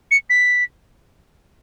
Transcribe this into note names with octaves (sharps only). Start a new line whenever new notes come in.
C#7
B6